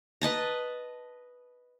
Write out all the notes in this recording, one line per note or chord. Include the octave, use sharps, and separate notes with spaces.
B4 D#5 A5 A#5